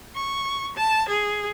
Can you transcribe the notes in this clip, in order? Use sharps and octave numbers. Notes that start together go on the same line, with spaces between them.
C#6
A5
G#4